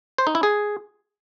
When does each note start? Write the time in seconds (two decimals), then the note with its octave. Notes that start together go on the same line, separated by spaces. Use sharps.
0.18 C5
0.27 D#4
0.35 E4
0.43 G#4